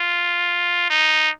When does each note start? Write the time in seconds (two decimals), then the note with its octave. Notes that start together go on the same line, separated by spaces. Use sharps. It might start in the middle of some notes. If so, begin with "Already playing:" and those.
Already playing: F4
0.90 D#4